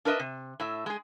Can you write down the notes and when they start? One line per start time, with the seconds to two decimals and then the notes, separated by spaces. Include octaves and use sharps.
0.05 D4 A#4 B4 D#5 E5
0.20 C3
0.60 A2 E5
0.86 G#3 G#4